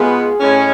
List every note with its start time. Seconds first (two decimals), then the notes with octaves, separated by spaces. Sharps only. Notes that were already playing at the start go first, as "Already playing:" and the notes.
Already playing: B2 G#3 B3 F4 G#4 B4
0.41 A2 G#3 C#4